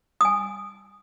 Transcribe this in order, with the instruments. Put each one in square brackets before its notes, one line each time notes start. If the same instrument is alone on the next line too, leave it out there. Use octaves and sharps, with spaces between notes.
[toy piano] G#5 D#6